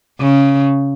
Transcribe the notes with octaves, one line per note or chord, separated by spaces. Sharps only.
C#3